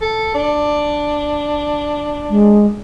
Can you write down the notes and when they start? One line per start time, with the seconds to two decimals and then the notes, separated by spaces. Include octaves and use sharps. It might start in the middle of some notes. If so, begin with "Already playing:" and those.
0.01 A4
0.34 D4
2.30 G#3